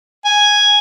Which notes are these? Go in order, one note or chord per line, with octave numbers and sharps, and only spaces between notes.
G#5